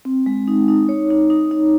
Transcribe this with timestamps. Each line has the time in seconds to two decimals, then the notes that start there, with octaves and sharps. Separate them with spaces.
0.05 C4
0.26 G#3
0.48 D#4
0.68 D#4
0.89 C#5
1.10 D#4
1.30 D#4
1.51 D#4